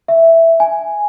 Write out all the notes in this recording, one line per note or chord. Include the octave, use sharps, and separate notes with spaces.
E5
G#5